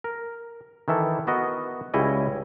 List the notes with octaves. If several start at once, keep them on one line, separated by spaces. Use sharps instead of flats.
A#4
D#3 E3 E4 A4
B3 F#4 A#4 D#5
C#2 G3 E4 G#4 C#5 D#5